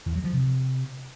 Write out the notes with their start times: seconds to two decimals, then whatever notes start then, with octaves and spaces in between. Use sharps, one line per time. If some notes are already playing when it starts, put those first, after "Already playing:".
0.06 E2
0.15 F#3
0.24 F3
0.33 C3